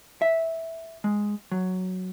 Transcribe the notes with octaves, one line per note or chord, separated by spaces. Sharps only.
E5
G#3
F#3